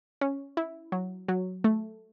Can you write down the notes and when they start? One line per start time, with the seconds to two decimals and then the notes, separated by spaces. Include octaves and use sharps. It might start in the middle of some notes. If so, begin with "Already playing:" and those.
0.21 C#4
0.57 E4
0.92 F#3
1.28 F#3
1.64 A3